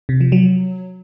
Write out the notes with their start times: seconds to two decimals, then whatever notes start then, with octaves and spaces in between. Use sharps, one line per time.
0.09 C3
0.21 F3
0.32 F#3